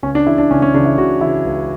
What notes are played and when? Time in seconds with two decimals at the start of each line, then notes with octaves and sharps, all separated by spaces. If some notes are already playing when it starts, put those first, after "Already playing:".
0.03 C#2 C#4
0.15 D4
0.26 C#3 E3 E4
0.38 D4
0.50 C#2 C#4
0.62 C#4
0.74 C#3 E3 D4
0.85 E4
0.97 C#2 F#4
1.21 C#3 E3 E4
1.45 C#2